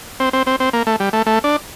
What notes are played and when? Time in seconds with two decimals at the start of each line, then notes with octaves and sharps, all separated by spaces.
0.20 C4
0.33 C4
0.47 C4
0.60 C4
0.73 A#3
0.87 A3
1.00 G3
1.13 A3
1.26 A3
1.44 D4